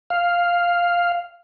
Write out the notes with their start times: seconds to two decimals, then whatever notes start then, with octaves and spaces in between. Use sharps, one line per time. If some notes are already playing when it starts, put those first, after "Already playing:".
0.10 F5